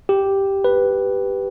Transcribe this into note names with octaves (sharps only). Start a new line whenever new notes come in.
G4
B4